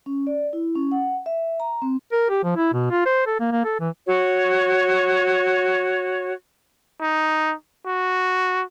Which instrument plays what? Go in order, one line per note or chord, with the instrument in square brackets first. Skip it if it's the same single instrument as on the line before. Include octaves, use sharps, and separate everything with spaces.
[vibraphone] C#4
D5
E4
C#4
F#5
E5
A#5
C4
[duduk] A#4
G4
F3
E4
B2
F4
C5
A4
A#3
A#3
A4
E3
[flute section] F#4 C#5
[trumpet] D#4
F#4